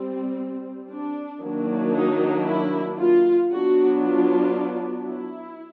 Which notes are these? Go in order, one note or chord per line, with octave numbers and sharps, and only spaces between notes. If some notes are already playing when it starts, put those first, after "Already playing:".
Already playing: G3 C4
D4
D#3 F#3 A#3 D4
D#4
E4
F4
F#3 B3 D4 F#4
F4
E4